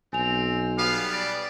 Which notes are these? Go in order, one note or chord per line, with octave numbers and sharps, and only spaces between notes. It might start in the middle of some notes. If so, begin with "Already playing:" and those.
B1 C4 G#5 F7
G3 B3 F5
D5